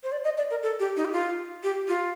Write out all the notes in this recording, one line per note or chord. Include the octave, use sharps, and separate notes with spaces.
C5
D5
D#5
D5
A#4
A4
G4
D#4
G4
F4
G4
F4